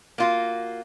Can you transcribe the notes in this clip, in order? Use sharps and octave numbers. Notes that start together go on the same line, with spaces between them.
A#3 F4 F#4